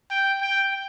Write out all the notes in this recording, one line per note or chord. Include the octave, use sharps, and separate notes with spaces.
G5
G5